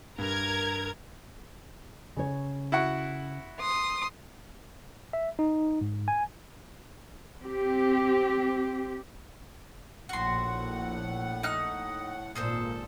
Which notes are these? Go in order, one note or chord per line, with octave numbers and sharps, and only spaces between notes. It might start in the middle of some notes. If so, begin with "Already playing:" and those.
G2 A#4 A#5 G#6
C#3 C#5
E4 F#4 F#5
C6 D#6
E5
D#4
G#2
G#5
C4 G4
A#1 A2 F#4 F#5 C6
D#4 F6 F#6
G#1 A#2 G#4 A4 C5